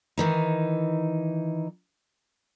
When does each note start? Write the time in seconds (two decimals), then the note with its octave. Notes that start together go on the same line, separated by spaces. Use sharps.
0.18 D#3 E3 D#4